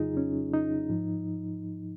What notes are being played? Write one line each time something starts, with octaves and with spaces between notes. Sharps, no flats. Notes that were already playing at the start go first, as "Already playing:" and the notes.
Already playing: F2 C#3 F#3 D#4 F4 G#4
C#4
D#4
G#2 F3